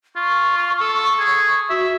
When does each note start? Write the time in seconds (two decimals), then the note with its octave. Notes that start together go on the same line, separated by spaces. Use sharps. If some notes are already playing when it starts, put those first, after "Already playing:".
0.16 F4 C#6
0.80 A4
1.19 G#4
1.70 F#4 E5